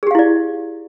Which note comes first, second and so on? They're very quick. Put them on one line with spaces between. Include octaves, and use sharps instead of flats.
G#4 G4 F5 E4 D5